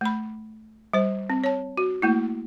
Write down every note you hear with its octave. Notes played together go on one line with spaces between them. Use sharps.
A3 B5
G3 C5
C4
C#5 A5
F#4
A3 A#3 E4